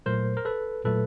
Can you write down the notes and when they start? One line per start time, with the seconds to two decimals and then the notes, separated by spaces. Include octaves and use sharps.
0.06 A#2 F#3 A3 A#4 C5
0.37 A#4
0.45 A4 B4
0.85 A#2 F#3 A3 A4 B4